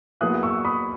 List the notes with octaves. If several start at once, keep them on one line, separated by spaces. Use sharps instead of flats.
A#2 F#3 B3 E4 G#4 D#6 F#6
C#6 E6
B5 D#6